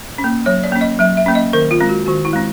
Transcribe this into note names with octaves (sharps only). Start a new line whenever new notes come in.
C#4
A#3
F#3 C#5
D5
A#3 C#4
D#5
F#3 E5
E5
A#3 C#4
D#5
D#3 A#4
F4
G#3 C4
F#4
D#3 F#4
E4
G#3 C4